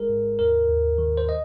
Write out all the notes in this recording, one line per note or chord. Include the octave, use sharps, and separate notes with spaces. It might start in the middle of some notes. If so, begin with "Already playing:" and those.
Already playing: G#1 G#3 G#4 A#4
G#2
D#2 A#4
D#2
D#3
C5
D#5